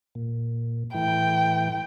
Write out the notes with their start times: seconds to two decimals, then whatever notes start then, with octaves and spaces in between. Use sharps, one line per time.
0.15 A#2
0.94 A2 E3 G5